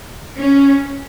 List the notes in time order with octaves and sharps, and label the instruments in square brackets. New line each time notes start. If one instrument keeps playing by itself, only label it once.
[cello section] C#4